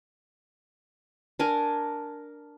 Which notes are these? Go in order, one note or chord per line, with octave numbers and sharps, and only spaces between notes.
D4 A#4 G#5